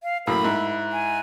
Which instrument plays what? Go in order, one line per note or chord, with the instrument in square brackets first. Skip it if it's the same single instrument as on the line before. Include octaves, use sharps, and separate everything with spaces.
[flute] F5
[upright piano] F#2 A2 A#3 [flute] B5
[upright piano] G#2 E4
[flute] G#5